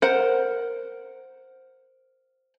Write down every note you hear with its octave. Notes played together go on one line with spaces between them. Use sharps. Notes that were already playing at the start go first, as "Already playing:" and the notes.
A#4 C5 F#5